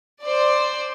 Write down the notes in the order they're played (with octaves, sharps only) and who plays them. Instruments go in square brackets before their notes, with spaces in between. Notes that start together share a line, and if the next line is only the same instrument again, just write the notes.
[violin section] C5 D5